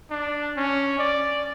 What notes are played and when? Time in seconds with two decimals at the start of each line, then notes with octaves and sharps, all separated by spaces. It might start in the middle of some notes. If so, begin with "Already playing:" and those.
0.11 D4
0.57 C#4
0.99 D5